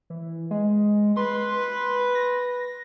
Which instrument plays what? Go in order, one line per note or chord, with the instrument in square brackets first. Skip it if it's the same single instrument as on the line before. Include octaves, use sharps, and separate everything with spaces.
[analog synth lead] E3
G#3
[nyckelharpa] B4 [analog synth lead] C6
[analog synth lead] A#6